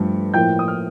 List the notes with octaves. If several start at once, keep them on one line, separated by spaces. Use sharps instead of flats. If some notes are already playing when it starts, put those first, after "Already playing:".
Already playing: G2 F3 A3
A2 F3 A#3 G5 G6
D#6
F6